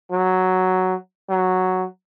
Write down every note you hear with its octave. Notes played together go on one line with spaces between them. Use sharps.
F#3
F#3